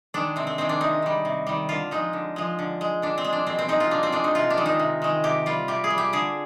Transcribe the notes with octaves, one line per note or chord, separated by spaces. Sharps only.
D#3 G#3 D4
C3 C4
C4
D#3 G#3 C4
D4
C3 D#4
D#3 G3
C3
D#3 G3
D3 F4
F3 G#3 D#4
D3
F3 G#3
D3
G#3
D3 D4
C4
G#3
D4
B2 C4
C4
G#3 D#4
F4
B2 D4
C4
G#3 D4
D#4
C3 F4
D4
D#3 G#3
D#4
C3
D#3 G#3
C3 G4
G3 F4
C3 G4
G#4
G3
G4
D3 G#4